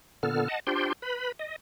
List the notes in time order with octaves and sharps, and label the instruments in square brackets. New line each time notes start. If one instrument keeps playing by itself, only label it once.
[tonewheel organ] A#2 D3 B3 A4 F6
D#5 F#5 A5
D4 F4 G4 C5 G5 C6
B4 B5
D#5